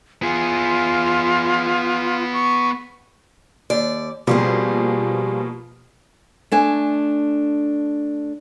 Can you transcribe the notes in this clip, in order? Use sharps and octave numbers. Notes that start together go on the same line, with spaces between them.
B3 F4 G#4
C#6
D#2 D5
B2 F3 G3 A#3 C4 G#4
A3 D4 G#5